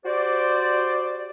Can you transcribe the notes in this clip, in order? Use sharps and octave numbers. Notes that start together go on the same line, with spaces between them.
F#4 G4 C5 D5